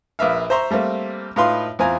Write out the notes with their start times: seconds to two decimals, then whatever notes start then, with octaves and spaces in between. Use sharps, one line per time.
0.19 A#1 B4 E5 F5
0.50 C5 E5 A#5 C6 C#6
0.71 G3 A3 A#3 C4
1.36 A2 D#4 F4 B4 F5 C6
1.79 E2 C4 F4 G#5 A#5